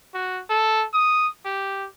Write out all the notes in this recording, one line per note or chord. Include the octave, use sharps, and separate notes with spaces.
F#4
A4
D#6
G4